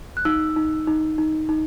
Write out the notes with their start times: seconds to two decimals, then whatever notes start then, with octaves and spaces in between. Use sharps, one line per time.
0.17 F#6
0.25 D#4 E6
0.56 D#4
0.87 D#4
1.18 D#4
1.49 D#4